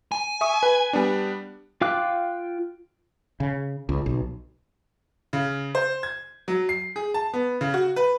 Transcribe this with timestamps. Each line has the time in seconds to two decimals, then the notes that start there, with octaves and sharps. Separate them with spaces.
0.12 G#5
0.41 E5 C#6 D#6
0.63 B4
0.93 G3 B3 D4
1.81 F4 F5 G5 D6 F#6
3.40 C#3
3.89 C#2
4.06 B1
5.33 C#3
5.75 C5
6.03 G#6
6.48 F#3
6.69 C7
6.96 G#4
7.14 A5
7.33 B3
7.61 C#3
7.74 F#4
7.96 B4